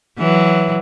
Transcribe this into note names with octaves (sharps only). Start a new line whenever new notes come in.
E3 F#3